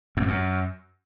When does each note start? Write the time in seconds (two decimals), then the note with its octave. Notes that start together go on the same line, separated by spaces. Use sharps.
0.17 F#2
0.22 F2
0.28 F#2